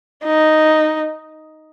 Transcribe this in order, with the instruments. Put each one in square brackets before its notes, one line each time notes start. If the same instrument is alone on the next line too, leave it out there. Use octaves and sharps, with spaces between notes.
[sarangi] D#4